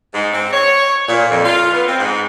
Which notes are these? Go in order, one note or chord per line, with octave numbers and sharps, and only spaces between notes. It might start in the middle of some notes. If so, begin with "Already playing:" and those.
G#2
C4
C#5
A#2
F2
F4
B3
C4
G#2